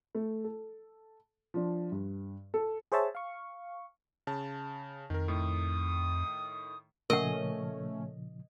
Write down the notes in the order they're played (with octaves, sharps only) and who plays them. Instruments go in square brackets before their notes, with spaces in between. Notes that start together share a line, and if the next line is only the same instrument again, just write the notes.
[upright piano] A3
A4
F3 D4
G2
A4
[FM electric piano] G#4 C5 C#5 E5 A5
F5 C#6
[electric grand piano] C#3 A5
[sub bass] F2 [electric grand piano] D#3 A#4
[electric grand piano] A2 D#3 [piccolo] D#6
[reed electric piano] A#2 C#3 F3 [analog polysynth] A3 C#4 [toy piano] A#4 F#5 [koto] D#5